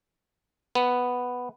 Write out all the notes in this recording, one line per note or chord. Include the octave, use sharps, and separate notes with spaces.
B3